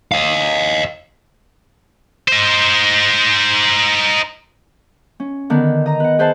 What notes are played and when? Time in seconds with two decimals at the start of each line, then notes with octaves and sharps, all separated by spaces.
0.12 D#5 F5
2.28 D#4 C5
5.20 C#4
5.50 D3 D#3 B3
5.86 D#5 A#5
6.00 B4 F#5
6.19 G#4 B4 C5 E5 F#5 A5